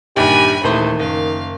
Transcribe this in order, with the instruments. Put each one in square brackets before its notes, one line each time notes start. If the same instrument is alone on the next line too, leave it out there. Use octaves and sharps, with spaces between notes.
[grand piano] A#1 G2 D#3 [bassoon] G4 [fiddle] G#5 B5
[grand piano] D#1 E3 C5 [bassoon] D#3 [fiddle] A3
[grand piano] F#1 [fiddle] F5